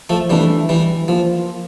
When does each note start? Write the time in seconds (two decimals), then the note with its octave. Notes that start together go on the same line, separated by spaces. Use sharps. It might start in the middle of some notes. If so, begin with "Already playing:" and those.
0.09 F3 A3
0.30 E3 G3 A3 D4 A4 D5
0.69 E3 G3
1.08 F3 A#3 F4